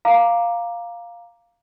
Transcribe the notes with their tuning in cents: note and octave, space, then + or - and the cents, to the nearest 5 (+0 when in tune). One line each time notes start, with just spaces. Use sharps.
F5 +0 A#5 +5 D6 +0